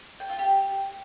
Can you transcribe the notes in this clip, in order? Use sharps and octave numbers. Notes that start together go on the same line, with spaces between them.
G5
F4
G4